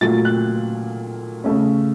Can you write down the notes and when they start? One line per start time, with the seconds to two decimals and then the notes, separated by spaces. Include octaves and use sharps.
0.01 A#2 F#3 A3 A6
0.25 F#6
1.44 C#3 A3 C#4